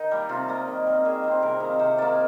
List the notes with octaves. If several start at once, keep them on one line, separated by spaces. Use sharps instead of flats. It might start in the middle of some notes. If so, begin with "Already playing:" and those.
Already playing: D#3 D#4
G3 A#3
C3 F4
G3 A#3
D#3
G3 C4
D#3 G#4
G3 C4
C3 A#4
D#3 A#3
C3 C5
D#3 A#3 D5